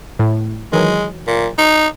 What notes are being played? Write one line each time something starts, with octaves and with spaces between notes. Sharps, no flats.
A2
D#3 E3 F#3 G#3
A#2
D#4